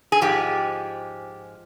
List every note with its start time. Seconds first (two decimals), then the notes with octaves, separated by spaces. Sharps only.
0.12 G#4
0.21 G#2 F3 G#3 G4